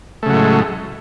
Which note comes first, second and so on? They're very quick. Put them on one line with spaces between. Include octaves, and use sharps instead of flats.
A3 C#3 F#3 A2 G#3